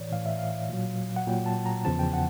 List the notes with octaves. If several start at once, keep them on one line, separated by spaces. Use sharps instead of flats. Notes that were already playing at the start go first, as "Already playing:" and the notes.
Already playing: A2 E3 C#5 D5
A2 E3 F5
E5
F5
A#2 F#3
F#5
A#2 F#3 G5
A5
A#5
E2 C#3 F3 A5
G5
F#5